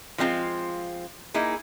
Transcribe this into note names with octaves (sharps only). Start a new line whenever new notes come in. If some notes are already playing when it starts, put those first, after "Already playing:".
F3 G#3 C4 D4 F4
A#3 D#4 E4 G#4